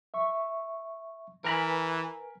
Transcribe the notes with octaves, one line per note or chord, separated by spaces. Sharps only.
E5 C#6
E3 A#4 B4 G#5 A#5 B5